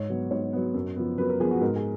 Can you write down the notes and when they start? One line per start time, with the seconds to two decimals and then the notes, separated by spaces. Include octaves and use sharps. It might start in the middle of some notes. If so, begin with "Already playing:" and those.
Already playing: G#2 C#5
0.10 F#3 B3
0.31 G#2 C#5
0.53 F#3 B3
0.74 F#2
0.96 F3 B3
1.18 F#2 B4
1.29 A#4
1.40 F3 B3 G#4
1.51 F#4
1.61 G#2 A#4
1.76 G#4